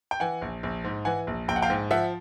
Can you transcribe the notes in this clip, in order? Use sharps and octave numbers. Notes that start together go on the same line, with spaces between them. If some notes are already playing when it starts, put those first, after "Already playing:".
G5
E3 F#5 G#5
A#1
A#1
G#2
E3 F#5 G#5
A#1
A#1 G5
F#5
F5 G5
G#2
F3 E5 F#5